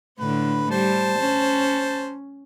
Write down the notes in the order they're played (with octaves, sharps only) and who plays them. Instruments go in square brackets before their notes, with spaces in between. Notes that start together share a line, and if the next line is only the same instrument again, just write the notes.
[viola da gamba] A2 D3 [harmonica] B4
[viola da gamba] G3 [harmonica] C5 A5
[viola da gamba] C#4